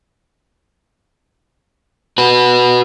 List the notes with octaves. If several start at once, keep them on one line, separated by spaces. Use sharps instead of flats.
F#4 B4